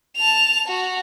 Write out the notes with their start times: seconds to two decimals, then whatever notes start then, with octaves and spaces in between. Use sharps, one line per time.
0.17 A5 F7
0.67 F#4